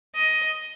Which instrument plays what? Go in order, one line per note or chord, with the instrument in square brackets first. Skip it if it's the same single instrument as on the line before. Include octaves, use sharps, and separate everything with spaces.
[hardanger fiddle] D#5